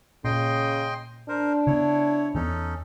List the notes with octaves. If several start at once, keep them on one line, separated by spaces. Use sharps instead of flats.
A#2 C#3 D#5 G5 C6
D4 A#4 C5
C#3 B3 E4 C#5
E2 E3 B3 C#4 D#4 A4